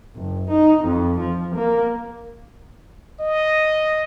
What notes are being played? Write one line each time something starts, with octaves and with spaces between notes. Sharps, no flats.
F#1
D#4
F2
F3
A#3
D#5